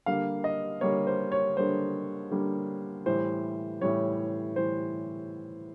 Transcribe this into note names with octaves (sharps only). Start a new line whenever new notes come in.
D3 G3 A#3 F5
D#5
D3 G3 A#3 C#5
C5
C#5
D3 G3 A#3 C5
D3 G3 A#3
A2 E3 G3 C5
A2 E3 G3 C#5
A2 E3 G3 C5